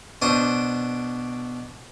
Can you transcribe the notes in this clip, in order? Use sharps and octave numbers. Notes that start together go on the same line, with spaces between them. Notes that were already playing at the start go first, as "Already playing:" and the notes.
B2 D4 C5 D#6